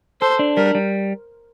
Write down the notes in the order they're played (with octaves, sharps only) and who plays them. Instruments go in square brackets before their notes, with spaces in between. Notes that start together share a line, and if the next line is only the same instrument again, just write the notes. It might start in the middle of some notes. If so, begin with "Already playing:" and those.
[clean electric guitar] A4 [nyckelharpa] C5
[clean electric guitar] D4
[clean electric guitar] G3 [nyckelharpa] A#4
[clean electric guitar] G3